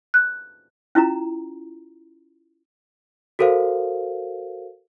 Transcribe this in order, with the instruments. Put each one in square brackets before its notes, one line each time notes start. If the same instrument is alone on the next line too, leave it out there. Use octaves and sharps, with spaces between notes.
[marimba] F#6
[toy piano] C#4 E4 F4 A#5
[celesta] F#4 A4 A#4 C5 F5